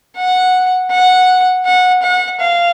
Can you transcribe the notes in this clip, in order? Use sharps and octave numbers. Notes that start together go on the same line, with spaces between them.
F#5
F#5
F#5
F#5
F5